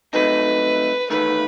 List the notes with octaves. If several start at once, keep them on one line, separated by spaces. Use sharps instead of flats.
C2 C3 F#3 A3 D#4 B4
E2 D#3 A3 B4